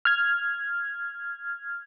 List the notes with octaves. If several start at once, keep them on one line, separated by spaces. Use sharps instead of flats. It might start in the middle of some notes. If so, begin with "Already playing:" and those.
F6 G#6